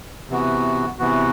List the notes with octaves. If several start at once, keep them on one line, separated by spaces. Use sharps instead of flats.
C3 E3 B3 F#4
C3 E3 B3 F#4